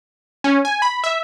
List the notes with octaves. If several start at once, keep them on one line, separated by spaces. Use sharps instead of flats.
C#4
G#5
B5
E5